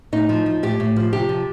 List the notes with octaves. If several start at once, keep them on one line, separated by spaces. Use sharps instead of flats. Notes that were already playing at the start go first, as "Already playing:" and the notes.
A2 D#4
F3
F3
A2 G4
A2
F3
C3 G4
F3